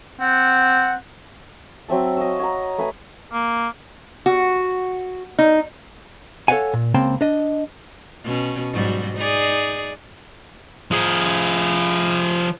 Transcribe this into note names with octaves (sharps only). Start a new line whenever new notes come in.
C4 F#5
F#3 C4 E5 A5
D#5 F5 C#6 E6
C#5 F#5 A#5
A3 B4 G#5
A#3
F#4
D#4
A4 C#5 D#5 F5 F#5 G#5
A#2
C#2 C#3 A#3 C4 G5 A5
D4 D#5
B2 C#4
G#2 F#3 G3
D#4 G#4 D5
F3 G#4